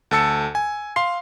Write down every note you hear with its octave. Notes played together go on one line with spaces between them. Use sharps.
D2 A4 A5 E6 C#7
G#5
F5 C6 C7